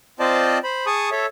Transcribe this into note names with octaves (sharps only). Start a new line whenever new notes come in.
C4 F4 C5 D5 D#5 A5
C5 B5
G#4 A5 C#6 D#6
A4 C#5 E5